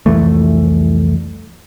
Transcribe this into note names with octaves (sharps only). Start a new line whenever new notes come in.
C2 F2 E3 A3